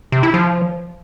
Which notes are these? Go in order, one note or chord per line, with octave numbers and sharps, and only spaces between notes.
C3
E4
F3